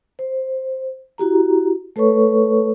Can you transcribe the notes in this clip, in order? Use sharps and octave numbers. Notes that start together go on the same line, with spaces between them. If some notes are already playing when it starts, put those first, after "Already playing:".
C5
E4 F#4 G4 A#5
A3 A4 B4 C#5 C#6